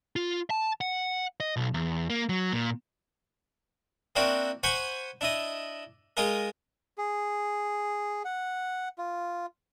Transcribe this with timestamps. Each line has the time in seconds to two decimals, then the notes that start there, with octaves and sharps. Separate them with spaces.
0.16 F4
0.50 A5
0.81 F#5
1.40 D#5
1.57 B1
1.74 E2
2.10 A#3
2.29 F#3
2.53 A#2
4.16 A#3 C4 D4 E4 F#4
4.63 C5 F#5 G#5 B5 C#6
5.21 D4 E4 D#5
6.17 G#3 F4 G#4 A#4
6.98 G#4
8.25 F#5
8.98 F4